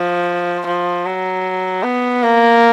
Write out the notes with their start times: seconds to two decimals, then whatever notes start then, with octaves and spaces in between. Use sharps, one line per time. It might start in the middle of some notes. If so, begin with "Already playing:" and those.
Already playing: F3
0.66 F3
1.05 F#3
1.83 B3
2.23 A#3